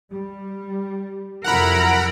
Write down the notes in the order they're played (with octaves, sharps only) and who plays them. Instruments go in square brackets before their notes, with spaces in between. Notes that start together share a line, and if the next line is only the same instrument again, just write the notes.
[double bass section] G3
[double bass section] F2 C3 F#3 [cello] E4 A#4 [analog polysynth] F#5 A#5 B5